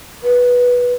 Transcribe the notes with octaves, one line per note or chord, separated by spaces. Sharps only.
B4